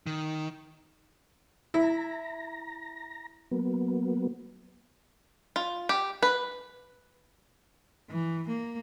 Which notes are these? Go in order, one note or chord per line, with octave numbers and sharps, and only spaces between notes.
D#3
E4 A#5
F#3 A#3 B3
F4
G4
B4
E3
A#3